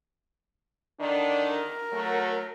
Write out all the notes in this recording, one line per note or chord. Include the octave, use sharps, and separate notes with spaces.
D3 D#3 D4
A#4
F#3 A3